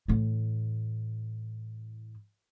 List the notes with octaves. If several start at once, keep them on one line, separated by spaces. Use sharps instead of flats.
A2 E3